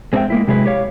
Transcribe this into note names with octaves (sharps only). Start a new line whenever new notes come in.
G#3 C4 D#4 A4 E5 G5
G#3 A#3 E4
C3 F#3 G#3 E4 G#4 B4
G4 C#5 F5